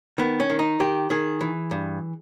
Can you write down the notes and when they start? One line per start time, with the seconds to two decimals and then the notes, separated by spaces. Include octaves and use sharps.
0.18 D#3 B3
0.40 C#4
0.50 D#3
0.59 D#4
0.80 D#3 G4
1.10 D#3 G#4
1.41 E3
1.71 G2